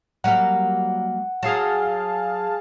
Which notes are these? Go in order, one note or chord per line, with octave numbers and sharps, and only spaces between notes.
F#3 G3 A#3 F#5
F#3 G#4 F5 A5